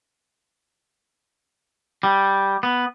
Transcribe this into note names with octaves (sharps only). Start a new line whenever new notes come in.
G3
B3